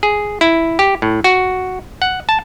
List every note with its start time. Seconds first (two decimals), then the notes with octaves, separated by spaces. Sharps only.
0.03 G#4
0.41 E4
0.79 G4
1.02 A2
1.24 F#4
2.02 F#5
2.29 A5